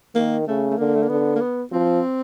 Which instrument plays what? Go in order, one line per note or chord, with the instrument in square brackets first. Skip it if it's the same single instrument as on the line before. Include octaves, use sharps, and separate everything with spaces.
[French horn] D#3 [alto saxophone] A#3
[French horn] C#3 [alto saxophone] A3
[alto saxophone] A3
[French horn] D3 [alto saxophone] A#3
[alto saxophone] A3
A#3
[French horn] D3 [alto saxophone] B3
[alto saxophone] A#3
B3
[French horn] F3 [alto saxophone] C4